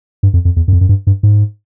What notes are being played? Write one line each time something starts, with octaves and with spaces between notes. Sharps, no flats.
G2
F2
F2
E2
F#2
F2
F#2
G2
G2
G#2